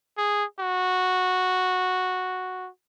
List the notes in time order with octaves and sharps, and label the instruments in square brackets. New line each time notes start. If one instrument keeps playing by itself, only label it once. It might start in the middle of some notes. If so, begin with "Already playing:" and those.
[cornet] G#4
F#4